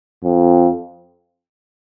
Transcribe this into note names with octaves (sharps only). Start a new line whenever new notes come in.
F2